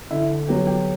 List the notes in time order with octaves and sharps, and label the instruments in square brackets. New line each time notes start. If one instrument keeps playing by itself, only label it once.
[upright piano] D3 [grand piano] E4 E5
[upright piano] F#3 B3 [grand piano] G4 G5
[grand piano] G4 G5